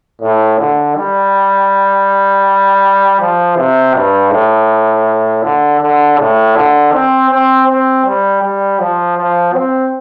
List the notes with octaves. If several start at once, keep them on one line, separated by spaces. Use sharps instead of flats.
A2
D3
G3
F3
C3
G2
A2
D3
D3
A2
D3
C4
C4
C4
G3
G3
F3
F3
C4